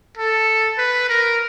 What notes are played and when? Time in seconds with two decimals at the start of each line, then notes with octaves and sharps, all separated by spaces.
0.18 A4
0.78 B4
1.09 A#4